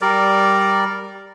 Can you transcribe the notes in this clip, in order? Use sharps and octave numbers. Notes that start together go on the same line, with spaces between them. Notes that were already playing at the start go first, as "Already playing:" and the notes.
G3 A#4 D5